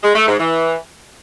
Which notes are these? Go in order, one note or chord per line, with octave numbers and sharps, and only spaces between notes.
G#3
A3
G#2
E3